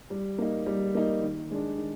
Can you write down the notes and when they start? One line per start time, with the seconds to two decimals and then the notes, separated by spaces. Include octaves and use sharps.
0.10 G3
0.38 A#3 D#4
0.66 G3
0.95 A#3 D#4
1.22 D#3
1.51 G#3 D4
1.78 D#3